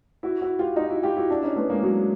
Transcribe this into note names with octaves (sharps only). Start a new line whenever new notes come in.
E4 F#4
E4 F#4
F4 G4
D#4 F4
E4 F#4
F4 G4
E4 F#4
D4 E4
C#4 D#4
A3 B3
G#3 A#3
F#3 G#3